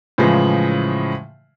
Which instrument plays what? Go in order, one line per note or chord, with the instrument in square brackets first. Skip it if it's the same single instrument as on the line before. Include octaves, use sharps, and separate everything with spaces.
[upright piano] A2 C#3 E3 F3 G#3